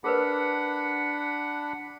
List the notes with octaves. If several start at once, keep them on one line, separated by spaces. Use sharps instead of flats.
D4 G#4 A#4 B4 F#5 B5